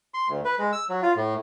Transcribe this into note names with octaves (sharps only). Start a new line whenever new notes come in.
C6
D2
B4
G#3
E6
F#3
F4
A2